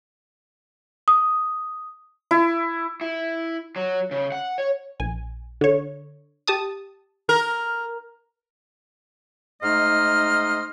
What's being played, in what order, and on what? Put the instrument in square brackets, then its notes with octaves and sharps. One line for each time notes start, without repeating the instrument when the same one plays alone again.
[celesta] D#6
[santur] E4
[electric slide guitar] E4
F#3
C#3
F#5
C#5
[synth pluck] A#1 G#5
D3 C#5
G4 A5 D#6
[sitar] A#4
[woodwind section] G#2 A3 D#4 D#5 C6 F6